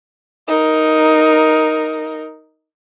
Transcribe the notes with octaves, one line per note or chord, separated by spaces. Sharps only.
D#4 A#4